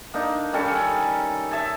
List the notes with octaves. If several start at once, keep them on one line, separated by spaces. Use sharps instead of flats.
A#3 D4 D#4
D#3 G3 C#4 A4
E5 G#5 A5